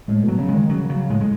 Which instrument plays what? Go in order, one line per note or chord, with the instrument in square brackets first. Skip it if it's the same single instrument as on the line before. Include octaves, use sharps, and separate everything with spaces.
[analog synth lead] A2 [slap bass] G#3
[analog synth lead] B2
[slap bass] F#3
[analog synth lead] C#3
[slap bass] G#3
[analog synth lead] D#3
[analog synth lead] C#3 [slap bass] F#3
[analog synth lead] C#3 [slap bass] F#3
[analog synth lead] A2 [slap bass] G#3
[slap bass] G#3